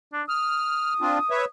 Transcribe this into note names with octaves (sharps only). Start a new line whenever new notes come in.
D4
D#6 F6
C4 D4 F4
B4 C#5 E5